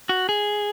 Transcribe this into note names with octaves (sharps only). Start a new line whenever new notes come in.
F#4
G#4